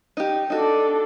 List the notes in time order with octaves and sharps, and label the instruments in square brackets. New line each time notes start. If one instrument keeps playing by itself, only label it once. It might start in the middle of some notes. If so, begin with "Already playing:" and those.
[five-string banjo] D#4 G4
[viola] D4 A4 [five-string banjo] D#4 F#4